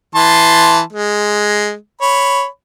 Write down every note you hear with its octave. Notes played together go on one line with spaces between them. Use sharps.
E3 A5 C6
G#3
C#5 B5